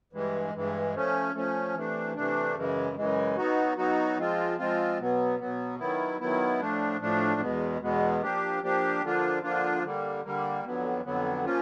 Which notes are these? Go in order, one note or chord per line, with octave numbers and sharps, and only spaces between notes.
G2 E3 G#3
G2 E3 G#3
F3 A3 C#4
F3 A3 C#4
C3 E3 A3 D4
C3 E3 A3 D4
F#2 C#3 E3 G#3
F#2 C#3 E3 G#3
F#3 B3 D#4 F#4
F#3 B3 D#4 F#4
F3 G#3 C4 F4
F3 G#3 C4 F4
B2 F#3 B3
B2 F#3 B3
D#3 F#3 B3 E4
D#3 F#3 B3 E4
A2 F3 A3 D4
A2 F3 A3 D4
E2 B2 G#3 B3
E2 B2 G#3 B3
F3 A#3 D4 G4
F3 A#3 D4 G4
D3 F3 A#3 D4 F4
D3 F3 A#3 D4 F4
D3 G3 A#3
D3 G3 A#3
F2 D3 F#3 B3
F2 D3 F#3 B3
F3 A#3 C#4 F4